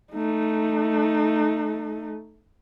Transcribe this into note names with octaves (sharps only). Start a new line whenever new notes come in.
A3 D#4